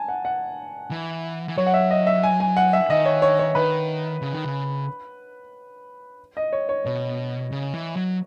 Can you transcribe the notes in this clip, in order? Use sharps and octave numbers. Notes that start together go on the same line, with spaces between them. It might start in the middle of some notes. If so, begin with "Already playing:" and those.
Already playing: G#5 A5
F#5
F#5
E3
E3
F#3 C#5
F#5
E5
D#5
E5
G#5
G#5
F#5
E5
D#3 D#5
C#5
C#5
C#5
D#3 B4
C#3
D#3
C#3
D#5
C#5
C#5
B2 C#5
C#3
E3
F#3